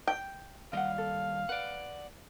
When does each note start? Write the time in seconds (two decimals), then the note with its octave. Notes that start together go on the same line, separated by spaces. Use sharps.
0.07 G5
0.73 D#2 G3 D#5 F5 F#5
0.98 A4
1.49 B4 D5 F#5